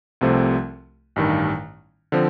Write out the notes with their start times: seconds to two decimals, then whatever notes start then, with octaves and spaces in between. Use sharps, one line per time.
0.21 C2 C3 F3 A3 C4
1.16 A1 G2 D#3
2.12 D3 F3 C4